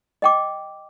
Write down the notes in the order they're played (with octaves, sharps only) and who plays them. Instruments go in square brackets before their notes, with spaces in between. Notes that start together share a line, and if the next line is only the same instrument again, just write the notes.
[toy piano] D#5 G5 D6